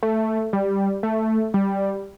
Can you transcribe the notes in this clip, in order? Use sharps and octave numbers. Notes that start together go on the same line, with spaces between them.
A3
G3
A3
G3